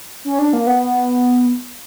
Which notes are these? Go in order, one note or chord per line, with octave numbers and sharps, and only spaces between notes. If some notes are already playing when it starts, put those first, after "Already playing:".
C#4
D4
A#3
B3